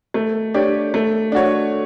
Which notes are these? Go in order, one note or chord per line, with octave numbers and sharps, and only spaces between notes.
A3
D4 G4 C#5
A3
D4 F#4 C#5